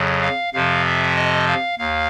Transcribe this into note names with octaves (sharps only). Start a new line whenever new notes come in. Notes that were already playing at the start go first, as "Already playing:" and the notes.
Already playing: F2 C#3 F#3
F5
F2 C3 F3 F5
E5
D#5
F5
D#2 F5